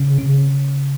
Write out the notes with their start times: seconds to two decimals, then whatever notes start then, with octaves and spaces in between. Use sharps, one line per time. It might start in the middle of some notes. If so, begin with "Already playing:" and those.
Already playing: C#3
0.18 C#3